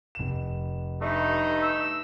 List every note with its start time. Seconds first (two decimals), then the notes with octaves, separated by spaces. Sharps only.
0.15 F1 E7
1.01 G2 A3 D#4
1.61 E6